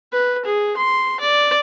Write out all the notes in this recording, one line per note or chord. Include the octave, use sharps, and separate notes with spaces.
B4
G#4
C6
D5